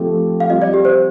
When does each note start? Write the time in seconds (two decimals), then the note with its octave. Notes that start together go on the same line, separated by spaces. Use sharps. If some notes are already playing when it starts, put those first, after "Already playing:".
Already playing: F3 A3 C4 G4
0.40 F5
0.50 G3 C4 F4 D#5
0.62 D5
0.74 G4
0.85 C5